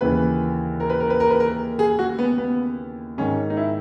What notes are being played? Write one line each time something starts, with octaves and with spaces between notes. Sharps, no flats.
D#2 C#3 E3 B4
A#4
B4
A#4
B4
A#4
B4
A#4
G#4
F#4
B3
B3
G#2 D#3 C#4
D#4
E4